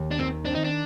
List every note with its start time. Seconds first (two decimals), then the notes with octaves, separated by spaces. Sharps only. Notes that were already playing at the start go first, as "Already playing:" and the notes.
Already playing: D#2
0.11 D4
0.19 D#3 C4
0.45 C4 D4
0.55 D#4
0.64 D4